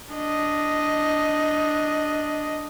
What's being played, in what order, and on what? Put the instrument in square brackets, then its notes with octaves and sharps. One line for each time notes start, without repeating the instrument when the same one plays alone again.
[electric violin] D4 D#5